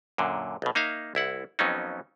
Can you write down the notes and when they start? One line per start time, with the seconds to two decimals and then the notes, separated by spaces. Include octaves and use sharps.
0.18 F#2 A#2 D3
0.62 B1 B2
0.75 A#3 D#4 E5 F5
1.15 C2 E4 F#5
1.59 F2 F#3 B3 C#4 D#4